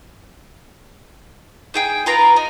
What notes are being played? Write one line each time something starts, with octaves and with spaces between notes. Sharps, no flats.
D#4 G#4 G5
F4 A#4 B4 A#5
D#4